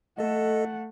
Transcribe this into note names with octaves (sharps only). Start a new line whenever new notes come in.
A3 A4 D#5 F#5